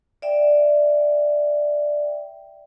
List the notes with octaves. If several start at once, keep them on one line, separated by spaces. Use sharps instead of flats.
D5 E5 G5